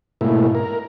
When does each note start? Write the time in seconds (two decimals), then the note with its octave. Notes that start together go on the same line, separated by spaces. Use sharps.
0.21 G#2 B2 A3 A#3 E4
0.55 A#4